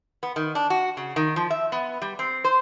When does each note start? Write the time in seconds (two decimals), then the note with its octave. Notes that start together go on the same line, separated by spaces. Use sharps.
0.23 B3
0.36 D#3
0.55 D4
0.70 F#4
0.97 C#3
1.16 D#3
1.36 F3
1.50 E5
1.72 B3
2.02 G3
2.19 C4
2.44 C5